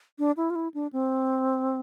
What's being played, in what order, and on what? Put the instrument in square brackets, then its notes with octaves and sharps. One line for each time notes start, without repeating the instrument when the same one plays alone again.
[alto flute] D4
E4
F4
E4
D4
C4